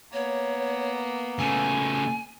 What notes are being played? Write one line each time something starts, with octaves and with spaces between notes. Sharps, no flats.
A#3 B3 C#5
C#3 A3 G#5